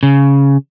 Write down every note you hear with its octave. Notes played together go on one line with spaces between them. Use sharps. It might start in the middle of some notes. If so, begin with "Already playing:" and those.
C#3